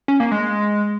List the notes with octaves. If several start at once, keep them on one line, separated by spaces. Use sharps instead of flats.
C#4
A#3
G#3